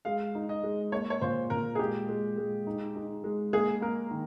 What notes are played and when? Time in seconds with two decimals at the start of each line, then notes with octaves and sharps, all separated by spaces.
0.05 G#3 F5
0.35 D#4
0.49 D#5
0.63 G#3
0.92 A#3 C#5
1.10 C#5
1.21 A#2 C5
1.50 A#2 A#4
1.75 G#4
1.79 G#3 G4
2.09 G#3
2.37 G#3
2.67 D#4
2.96 D#4
3.24 G#3
3.53 A#3 G#4
3.82 A#3 A#4
4.11 D#3